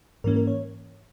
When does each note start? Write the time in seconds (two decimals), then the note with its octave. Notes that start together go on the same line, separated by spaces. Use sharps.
0.24 G#2 E3 A#3 C#4 A#4
0.36 A#4
0.47 C#5